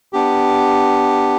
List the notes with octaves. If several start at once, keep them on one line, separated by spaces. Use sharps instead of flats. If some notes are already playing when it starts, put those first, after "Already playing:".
B3 D4 G4